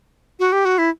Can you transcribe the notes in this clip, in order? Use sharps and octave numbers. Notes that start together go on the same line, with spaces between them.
F#4
G4
F#4
E4